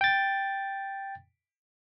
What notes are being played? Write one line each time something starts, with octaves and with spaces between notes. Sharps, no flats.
G5 A6